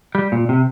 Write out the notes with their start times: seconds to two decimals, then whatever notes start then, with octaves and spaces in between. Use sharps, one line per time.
0.15 G3
0.32 A#2
0.49 C3